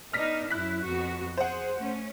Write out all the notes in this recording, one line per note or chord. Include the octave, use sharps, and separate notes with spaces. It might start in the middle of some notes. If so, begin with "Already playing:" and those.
B3 D4 D#4 F6 A#6 B6
F#2 E4 F#6 B6
F2 B3 F#4
G#4 C5 F#5
A3 C#4